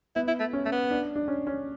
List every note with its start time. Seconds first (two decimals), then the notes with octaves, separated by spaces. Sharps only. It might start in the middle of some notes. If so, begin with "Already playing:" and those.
0.16 B3 E4
0.28 E4
0.40 A3
0.53 C#4
0.66 A3
0.72 B3
0.91 D4
1.16 D4
1.28 C#4
1.47 C#4